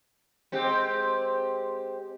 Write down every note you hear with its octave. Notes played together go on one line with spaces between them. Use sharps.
G#3 C4 G4